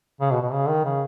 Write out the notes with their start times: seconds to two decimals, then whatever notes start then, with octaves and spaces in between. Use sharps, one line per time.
0.21 C#3
0.31 B2
0.41 B2
0.53 C#3
0.69 D#3
0.85 C#3